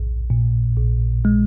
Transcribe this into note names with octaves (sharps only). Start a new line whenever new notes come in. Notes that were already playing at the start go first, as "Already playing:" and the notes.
Already playing: A#1
A#2
A#1
G#3